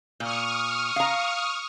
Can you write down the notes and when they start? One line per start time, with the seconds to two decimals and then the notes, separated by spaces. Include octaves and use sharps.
0.20 A#2 C#6 D#6 F6
0.96 F5 A#5